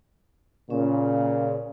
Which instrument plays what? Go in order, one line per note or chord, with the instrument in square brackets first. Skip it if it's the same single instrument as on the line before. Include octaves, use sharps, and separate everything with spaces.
[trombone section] A#2 C#3 [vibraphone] C#4